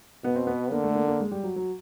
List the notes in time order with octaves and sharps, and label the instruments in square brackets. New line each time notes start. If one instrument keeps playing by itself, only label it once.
[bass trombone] B2 [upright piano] B3
[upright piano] C4
B3
[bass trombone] D3 [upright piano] A#3
[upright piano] A3
A#3
A#3
G#3
G3
F#3
F#3